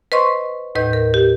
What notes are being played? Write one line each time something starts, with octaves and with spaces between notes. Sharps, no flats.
B4 C5 D#5 C6 C#6
D#2 A2 B4 D#5 G6
A#4
G4